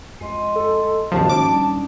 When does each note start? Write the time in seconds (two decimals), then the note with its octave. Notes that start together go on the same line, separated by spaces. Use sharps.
0.20 F2 G#3 D#5 C6
0.56 A4
1.12 G#1 D#2 C#3 F3 C#4 F#4 C5 A5
1.29 D#2 G#2 D#3 C#4 D#4 D6
1.52 D#1 G3 D4